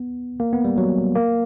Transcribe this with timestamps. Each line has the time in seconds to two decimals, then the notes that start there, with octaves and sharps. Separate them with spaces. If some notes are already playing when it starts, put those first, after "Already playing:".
Already playing: B3
0.40 A#3
0.53 B3
0.65 G3
0.78 F#3
1.15 A#3